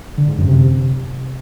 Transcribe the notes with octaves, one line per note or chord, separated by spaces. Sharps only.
D3
G#2
F#2
C3